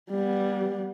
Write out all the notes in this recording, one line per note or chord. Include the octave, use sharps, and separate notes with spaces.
G3 B3